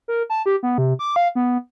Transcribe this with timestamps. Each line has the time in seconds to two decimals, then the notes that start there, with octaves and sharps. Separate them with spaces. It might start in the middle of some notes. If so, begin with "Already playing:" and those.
0.08 A#4
0.30 A5
0.46 G4
0.63 B3
0.78 C3
0.99 D6
1.16 F5
1.35 B3